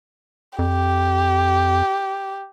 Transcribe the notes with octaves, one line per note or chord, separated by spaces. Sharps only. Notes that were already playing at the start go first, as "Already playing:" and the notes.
F2 G4